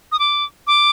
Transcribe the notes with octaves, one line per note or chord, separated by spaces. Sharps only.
D#6
D6
D6